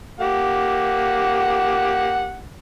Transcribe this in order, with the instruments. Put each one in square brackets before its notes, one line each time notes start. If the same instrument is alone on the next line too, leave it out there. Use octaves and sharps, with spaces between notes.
[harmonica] A#3 G4 F#5